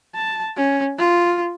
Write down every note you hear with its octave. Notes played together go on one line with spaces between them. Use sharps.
A5
C#4
F4